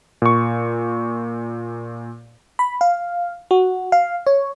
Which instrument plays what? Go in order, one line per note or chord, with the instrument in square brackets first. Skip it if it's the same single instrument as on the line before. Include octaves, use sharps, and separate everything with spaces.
[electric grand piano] A#2 C#6
[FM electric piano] B5
F5
F#4
F5
C#5